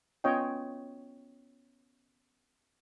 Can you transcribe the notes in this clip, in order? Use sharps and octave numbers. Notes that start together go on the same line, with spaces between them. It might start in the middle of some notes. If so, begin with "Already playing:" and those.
B3 C#4 F4 C#5 D#5 G5